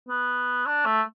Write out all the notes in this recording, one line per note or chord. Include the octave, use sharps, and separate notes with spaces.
B3
D4
A3